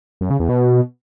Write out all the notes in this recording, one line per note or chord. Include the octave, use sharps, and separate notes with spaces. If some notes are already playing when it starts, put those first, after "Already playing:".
F#2
C#3
E2
B2